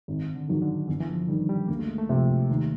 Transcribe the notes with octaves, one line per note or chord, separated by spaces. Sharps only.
G#1
D3
G#2 D#3 F#3
D3
G1 E3
E3
F3
G2 D#3 G3
G3
D2 A#3
A3
G#3
A3
C3 F3
D#2